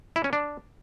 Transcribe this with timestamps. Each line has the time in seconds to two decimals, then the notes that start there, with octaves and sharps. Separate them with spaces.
0.16 E4
0.24 C#4
0.33 D4